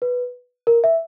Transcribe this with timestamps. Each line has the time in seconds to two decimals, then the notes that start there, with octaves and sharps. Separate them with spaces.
0.02 B4
0.67 A#4
0.84 E5